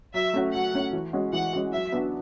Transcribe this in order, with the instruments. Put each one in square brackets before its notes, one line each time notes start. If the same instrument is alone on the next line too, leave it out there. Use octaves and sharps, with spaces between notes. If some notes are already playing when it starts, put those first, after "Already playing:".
[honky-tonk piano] F#3 [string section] E5
[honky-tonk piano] A3 C#4 F#4
[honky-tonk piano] F#3 [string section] F#5
[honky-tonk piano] A3 C#4 F#4
E3
G#3 C#4 F#4
[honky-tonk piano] E3 [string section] F#5
[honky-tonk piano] G#3 C#4 F#4
[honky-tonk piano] F#3 [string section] E5
[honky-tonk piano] B3 D4 F#4